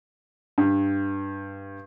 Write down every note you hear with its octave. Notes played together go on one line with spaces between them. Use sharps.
G2